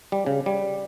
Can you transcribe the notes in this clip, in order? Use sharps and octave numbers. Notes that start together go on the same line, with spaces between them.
G3
C#3
G3